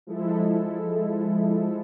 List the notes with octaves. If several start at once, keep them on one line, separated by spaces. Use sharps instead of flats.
F3 G#3 E4 A4